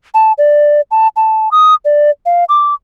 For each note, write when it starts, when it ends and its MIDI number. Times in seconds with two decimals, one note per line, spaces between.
0.14 0.32 81
0.38 0.81 74
0.91 1.08 81
1.16 1.49 81
1.51 1.74 87
1.85 2.10 74
2.26 2.45 77
2.49 2.74 86